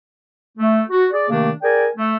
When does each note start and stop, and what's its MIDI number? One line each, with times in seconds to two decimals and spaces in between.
0.58 0.82 57
0.89 1.05 66
1.12 1.26 68
1.12 1.26 74
1.29 1.51 48
1.29 1.51 51
1.29 1.51 57
1.29 1.51 58
1.29 1.51 62
1.62 1.87 68
1.62 1.87 70
1.62 1.87 74
1.62 1.87 79
1.62 1.87 80
1.96 2.17 57